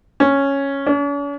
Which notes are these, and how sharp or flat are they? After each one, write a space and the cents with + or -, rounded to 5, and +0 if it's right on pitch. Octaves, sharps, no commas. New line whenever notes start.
C#4 -5
C#4 +45